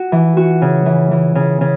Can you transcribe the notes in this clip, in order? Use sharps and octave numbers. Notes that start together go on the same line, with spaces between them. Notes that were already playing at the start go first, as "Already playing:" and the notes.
Already playing: F#4
E3
F#4
C#3
E3
E3
C#3
C#3